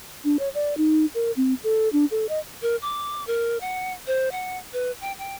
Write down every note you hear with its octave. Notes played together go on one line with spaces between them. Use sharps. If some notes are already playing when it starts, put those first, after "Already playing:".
D4
C#5
D5
D#4
A#4
C4
A4
D4
A4
D#5
A#4
D6
A#4
F#5
C5
F#5
B4
G5
G5